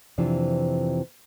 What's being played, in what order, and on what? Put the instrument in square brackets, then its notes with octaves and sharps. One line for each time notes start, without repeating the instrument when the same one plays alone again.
[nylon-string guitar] F2 C3 E3 F3 D4